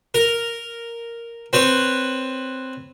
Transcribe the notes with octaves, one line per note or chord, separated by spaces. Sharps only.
A#4
C4 B4 C#5